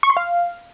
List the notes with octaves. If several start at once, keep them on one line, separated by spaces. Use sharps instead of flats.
C#6
C6
F5